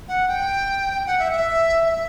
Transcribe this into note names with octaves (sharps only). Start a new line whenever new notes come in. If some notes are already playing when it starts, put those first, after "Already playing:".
F#5
G5
F#5
E5
E5
E5